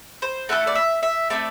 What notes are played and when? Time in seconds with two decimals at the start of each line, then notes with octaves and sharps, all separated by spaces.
0.22 C5
0.49 A3 E4 A4 F#5
0.67 D5
0.75 E5
1.03 E5
1.30 A3 C4 E4 D5